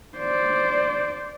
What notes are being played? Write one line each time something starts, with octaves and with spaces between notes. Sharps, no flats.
C5 D5